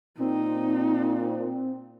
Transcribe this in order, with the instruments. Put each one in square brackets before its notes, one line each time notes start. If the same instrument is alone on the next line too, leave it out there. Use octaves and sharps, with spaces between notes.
[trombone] A#2 [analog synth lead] C4 [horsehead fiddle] D#4